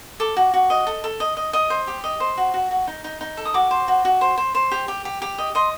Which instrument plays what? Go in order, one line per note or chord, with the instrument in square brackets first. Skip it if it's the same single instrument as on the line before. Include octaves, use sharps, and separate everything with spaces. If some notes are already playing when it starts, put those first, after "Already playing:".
[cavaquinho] A4 D6
F#4
F#4
D#5
A4
A4
D#5
D#5
D#5 D#6
C5
G4
D#5
C5
F#4
F#4
F#4
D#4
D#4
D#4
A4
D#6
F#4 D6
C5
F#4
F#4
C5
C5
C5
G4
G4
G4
G4
D#5
D#5 C6